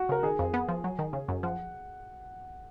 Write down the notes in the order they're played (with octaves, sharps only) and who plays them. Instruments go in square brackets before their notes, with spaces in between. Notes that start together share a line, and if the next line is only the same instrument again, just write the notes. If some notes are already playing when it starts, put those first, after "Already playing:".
Already playing: [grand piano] F#4
[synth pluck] C#3 [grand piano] A#4
[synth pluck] D#3 [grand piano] G#4
[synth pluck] F2
B3
F3
F#3
D#3
C#3
F#2
[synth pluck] F3 [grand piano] F#5